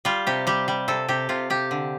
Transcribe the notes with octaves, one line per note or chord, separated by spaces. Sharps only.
G3 F4
C3 G4
G3 G4
G3
C3 A4
C3 G4
C3 F4
C3 G4
D3